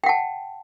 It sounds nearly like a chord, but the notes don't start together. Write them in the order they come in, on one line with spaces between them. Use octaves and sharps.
G5 F#5 A5